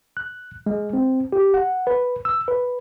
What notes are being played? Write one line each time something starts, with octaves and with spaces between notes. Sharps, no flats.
F#6
G#3
C4
G4
F#5
B4
E6
B4